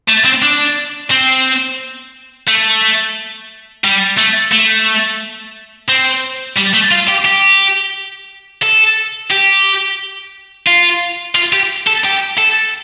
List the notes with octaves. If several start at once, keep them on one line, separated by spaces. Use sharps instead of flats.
A3
C4
D4
C4
A3
G3
A3
A3
C4
G3
A3
F4
G4
G4
A4
G4
F4
F4
G4
A4
G4
A4